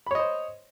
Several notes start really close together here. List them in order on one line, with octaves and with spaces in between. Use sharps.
B5 C#5 D#5 C5